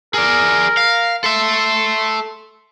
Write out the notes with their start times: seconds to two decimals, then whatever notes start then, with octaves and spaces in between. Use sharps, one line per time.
0.14 G#4 A#4 D5
0.77 F5
1.24 A4 E5 C6